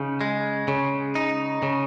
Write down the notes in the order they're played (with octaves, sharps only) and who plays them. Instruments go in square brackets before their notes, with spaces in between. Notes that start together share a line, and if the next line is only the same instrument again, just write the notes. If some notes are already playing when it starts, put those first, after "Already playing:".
Already playing: [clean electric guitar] C#3 D#4
G#3
C#3
D#4
C#3